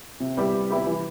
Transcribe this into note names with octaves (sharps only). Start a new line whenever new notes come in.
C3
G3 B3 E4 G4
C3
G3 B3 E4 G4
E3